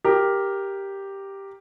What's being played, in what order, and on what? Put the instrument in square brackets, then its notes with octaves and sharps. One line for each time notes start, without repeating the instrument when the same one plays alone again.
[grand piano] G4 A#4